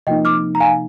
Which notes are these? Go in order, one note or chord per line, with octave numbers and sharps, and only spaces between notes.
C3 F3 A#3 D#4 D#5 G5
D6 F6
A#5
F5 G#5